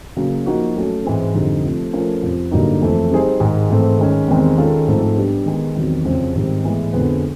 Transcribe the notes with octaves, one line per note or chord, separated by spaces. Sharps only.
C#3 F#3 A#3
F3 A#3 D#4 F#4
F#3 A3 C#4
G#2 E3 G#3 C4
F2 D3 G3 C4 D#4
C3 F3 A3
F3 A3 C#4 F4 A#4
F2 C3 F3
G2 D3 F#3 A#3 D#4
F2 C3 E3 A3 C4
G3 C4 D#4 G#4 C5
G#2 D#3 G#3
G#2 E3 A3 C4
D#3 G#3 C#4
E2 C3 D#3 G#3 C4
D#3 G#3 C#4 F4 A4
G#2 F3 A3 C4 D#4
G3 B3 D4 G4
D#3 G#3 B3
E2 C3 D#3 F#3
F2 C#3 F3 G#3 C4
G#2 D#3 G3 C4
A2 E3 G#3 B3
F2 D3 F3 G#3 B3